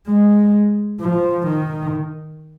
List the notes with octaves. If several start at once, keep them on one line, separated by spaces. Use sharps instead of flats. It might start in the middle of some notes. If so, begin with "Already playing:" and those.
G#3
F3
D#3